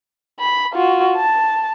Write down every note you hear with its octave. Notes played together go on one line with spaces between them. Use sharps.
B5
F4 F#4
A5